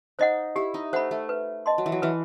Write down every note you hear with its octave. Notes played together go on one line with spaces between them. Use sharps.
D#4 C5 D#5 F#5
E4 G4
D#4
A3 C5 F#5 B5
A3
B4
D#5 A5 C6
F#3
E3
F#3
E3 B4